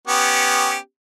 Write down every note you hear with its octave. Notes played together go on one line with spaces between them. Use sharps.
B3 C#4 G4